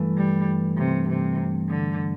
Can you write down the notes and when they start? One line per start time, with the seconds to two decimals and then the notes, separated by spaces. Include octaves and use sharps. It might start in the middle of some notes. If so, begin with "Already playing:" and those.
Already playing: G2 E3 A3
0.18 G3
0.78 C3
1.09 C3
1.69 D3